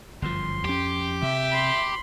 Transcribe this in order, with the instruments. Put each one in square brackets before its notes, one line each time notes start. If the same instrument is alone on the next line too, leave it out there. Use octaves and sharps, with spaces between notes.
[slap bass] G1 F#2 F3 [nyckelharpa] C6
[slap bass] F2 C#4 [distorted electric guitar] G4
[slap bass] C3 [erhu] E5
[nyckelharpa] B5 C6